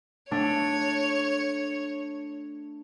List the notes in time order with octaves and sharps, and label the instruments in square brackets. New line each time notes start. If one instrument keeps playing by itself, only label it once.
[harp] A3 D4 [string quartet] C#5